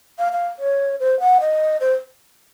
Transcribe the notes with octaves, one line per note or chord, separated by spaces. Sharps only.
F5
F5
C#5
C5
F#5
D#5
C5